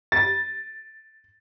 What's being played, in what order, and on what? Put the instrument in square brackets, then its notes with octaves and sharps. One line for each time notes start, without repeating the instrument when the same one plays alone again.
[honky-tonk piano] A6